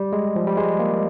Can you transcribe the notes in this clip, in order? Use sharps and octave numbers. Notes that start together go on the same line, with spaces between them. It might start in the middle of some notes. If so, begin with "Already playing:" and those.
Already playing: G3
G#3
F3
G3
G#3
A#3